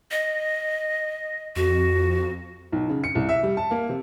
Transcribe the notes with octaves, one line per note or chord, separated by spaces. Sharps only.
D#5
F2 F#4
B1
C#3
C#7
C2
E5
G3
A5
A#3
C3